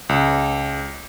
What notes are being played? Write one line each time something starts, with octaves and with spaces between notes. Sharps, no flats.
C#2